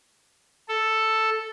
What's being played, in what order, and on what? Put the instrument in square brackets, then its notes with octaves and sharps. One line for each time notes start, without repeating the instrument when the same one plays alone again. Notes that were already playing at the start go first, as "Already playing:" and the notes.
[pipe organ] A4